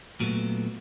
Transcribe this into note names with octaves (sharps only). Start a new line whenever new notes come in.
A#2 F#3 A3 B3